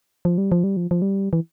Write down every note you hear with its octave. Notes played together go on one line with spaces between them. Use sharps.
F3
G3
F3
G3
F3
F3
G3
E3